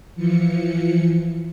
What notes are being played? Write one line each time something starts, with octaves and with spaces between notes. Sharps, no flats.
E3 F3 C#7